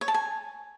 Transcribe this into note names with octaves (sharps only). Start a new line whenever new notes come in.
C#5
A5
G#5